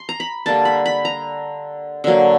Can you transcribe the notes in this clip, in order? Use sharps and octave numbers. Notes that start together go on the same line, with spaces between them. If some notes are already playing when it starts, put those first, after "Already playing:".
Already playing: C6
A#5
B5
D3 G3 A#3 A5
B5
B5
A#5
D3 F#3 A#3